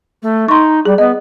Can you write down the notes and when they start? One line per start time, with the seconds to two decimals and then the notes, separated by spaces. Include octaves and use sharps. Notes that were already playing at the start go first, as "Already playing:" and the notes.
0.22 A3
0.48 D#4 C6 C#6
0.85 G3 G#4
0.98 B3 D#5